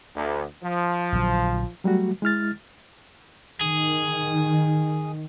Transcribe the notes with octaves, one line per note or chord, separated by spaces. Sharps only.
D2
F3
A#1 D3 F#3
F#3 G3 A3 F#4
G#3 E4 F6 A6
D#3 G#4